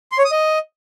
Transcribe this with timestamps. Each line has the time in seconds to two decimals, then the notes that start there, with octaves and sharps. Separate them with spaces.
0.12 C6
0.18 C#5
0.25 D#6
0.31 D#5